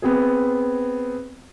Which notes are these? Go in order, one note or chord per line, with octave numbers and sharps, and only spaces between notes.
B3 C4 G#4